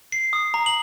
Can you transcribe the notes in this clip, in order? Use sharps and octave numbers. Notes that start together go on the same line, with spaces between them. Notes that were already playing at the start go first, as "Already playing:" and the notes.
C7
D#6
A#5
F#7